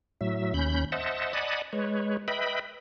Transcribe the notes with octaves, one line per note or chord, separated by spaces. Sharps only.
A2 F#3 E5
D#2 C#4 B5 G6
C5 D#5 E5 F#5 A5
D5 D#5 F#5 G#5 A5 B5
G#3 B4 C#5
B4 D#5 E5 G5 B5